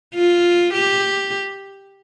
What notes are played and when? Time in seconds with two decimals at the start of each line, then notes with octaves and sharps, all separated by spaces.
0.15 F4
0.74 G4